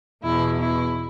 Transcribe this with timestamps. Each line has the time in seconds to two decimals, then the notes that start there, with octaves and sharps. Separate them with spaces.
0.23 E2 B2 E4
0.59 E4